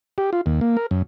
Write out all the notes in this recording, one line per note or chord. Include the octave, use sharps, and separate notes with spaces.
G4
F4
D#2
A#3
A#4
F#2